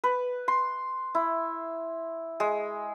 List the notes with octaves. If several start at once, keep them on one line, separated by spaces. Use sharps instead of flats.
B4
C6
E4
G#3